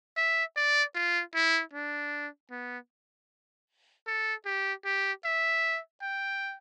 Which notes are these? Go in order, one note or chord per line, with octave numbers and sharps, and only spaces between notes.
E5
D5
F4
E4
D4
B3
A4
G4
G4
E5
G5